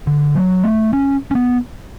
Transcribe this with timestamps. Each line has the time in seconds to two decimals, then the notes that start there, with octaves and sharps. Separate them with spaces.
0.07 D3
0.35 F#3
0.63 A3
0.93 C#4
1.31 C#4
1.35 B3